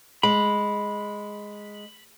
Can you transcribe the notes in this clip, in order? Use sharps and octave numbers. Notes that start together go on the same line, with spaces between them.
G#3 B5